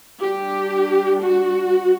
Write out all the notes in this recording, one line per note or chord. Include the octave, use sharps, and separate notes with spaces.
G3 D4 G4
F#4